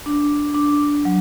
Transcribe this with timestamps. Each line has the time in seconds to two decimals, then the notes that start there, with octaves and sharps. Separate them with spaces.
0.06 D4
0.54 D4
1.05 F#3